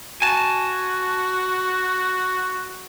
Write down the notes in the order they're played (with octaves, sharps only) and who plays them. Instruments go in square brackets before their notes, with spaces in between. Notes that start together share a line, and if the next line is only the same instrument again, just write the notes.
[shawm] F#4 [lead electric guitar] G#5 A5